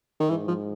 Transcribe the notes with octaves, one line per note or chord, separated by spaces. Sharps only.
D#3
G#2 E3
F3